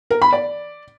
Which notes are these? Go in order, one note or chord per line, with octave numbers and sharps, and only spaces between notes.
A#4
B5
D5